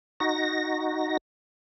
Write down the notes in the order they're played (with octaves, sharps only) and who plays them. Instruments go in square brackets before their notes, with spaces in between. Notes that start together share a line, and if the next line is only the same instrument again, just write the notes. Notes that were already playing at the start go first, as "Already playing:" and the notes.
[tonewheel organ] D#4 F#4 A#6